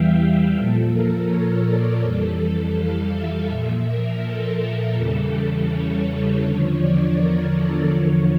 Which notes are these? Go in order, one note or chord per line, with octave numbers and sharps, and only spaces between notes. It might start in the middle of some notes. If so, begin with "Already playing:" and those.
Already playing: E2 E3 G3 E5 F5 G5
E5
A#2 F3 A4
A#4
C#5
D5
F2 E3 G3 A4
A4
F5
E5
A#2 F3 E5
A#4
A4
E2 C#3 E3 G3
A4
C#5
E2 D3 F3
D5
A#4
A4
E2 D3 F3 C#5